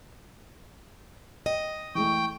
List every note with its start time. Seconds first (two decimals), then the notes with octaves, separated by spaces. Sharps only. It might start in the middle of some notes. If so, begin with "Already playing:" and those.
1.46 D#5 G5
1.95 E3 G#3 A3 G5 C#6